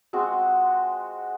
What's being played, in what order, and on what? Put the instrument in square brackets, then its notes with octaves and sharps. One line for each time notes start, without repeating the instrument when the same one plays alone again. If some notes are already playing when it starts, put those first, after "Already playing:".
[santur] G#3 C4 F#4